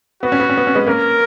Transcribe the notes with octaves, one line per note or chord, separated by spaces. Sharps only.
B3 F#4
C#4
B3
C#4
B3
C#4
G#3 B3
A#3 C#4 A#4